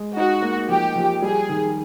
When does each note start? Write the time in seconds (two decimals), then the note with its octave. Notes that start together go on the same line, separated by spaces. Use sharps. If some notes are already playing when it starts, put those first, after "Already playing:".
Already playing: G#3
0.16 D#4 F#4
0.42 A#3
0.69 F3 G4
0.96 F3
1.22 G3 G#4
1.49 D#3